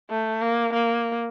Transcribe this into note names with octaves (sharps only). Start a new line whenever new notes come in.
A3
A#3
A#3